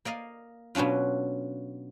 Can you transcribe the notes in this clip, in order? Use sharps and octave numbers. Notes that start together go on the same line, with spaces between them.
A#3 D5 D#5 F5
B2 F#3 C#4 D4 F4